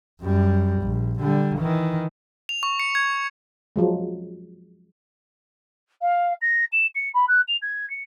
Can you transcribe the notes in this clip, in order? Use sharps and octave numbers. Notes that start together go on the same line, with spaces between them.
F#2 G3
A#1
D3 G3
D#3 E3
F7
C#6
C#7
G#6
F3 F#3 G#3
F5
A#6
E7
C#7
B5
F#6
F7
G#6
C#7